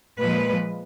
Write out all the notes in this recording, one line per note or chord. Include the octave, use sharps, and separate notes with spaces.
A#2 F3 G#3 B4